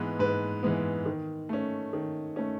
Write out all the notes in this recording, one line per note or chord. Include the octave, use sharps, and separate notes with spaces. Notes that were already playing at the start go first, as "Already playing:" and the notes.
Already playing: G#2 E3 G#3 B3 B4
G#2 B4
E3 G#3 B3
D#3
A3 C#4
D#3
A3 C#4